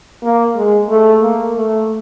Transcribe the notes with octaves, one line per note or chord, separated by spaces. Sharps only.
A#3
G#3
A3
A#3
A3